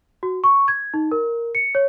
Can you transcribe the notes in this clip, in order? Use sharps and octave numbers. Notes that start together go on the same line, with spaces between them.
F#4
C#6
G#6
D#4
A#4
C#7
C#5